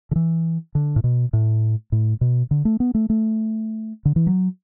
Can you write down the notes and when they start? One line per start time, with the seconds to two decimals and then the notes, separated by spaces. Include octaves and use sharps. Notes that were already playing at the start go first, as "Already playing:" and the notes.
0.11 D3
0.16 E3
0.75 D3
0.96 A2
1.04 B2
1.33 A2
1.92 A2
2.21 B2
2.51 D3
2.65 A3
2.80 B3
2.95 A3
3.10 A3
4.05 D3
4.16 E3
4.27 F#3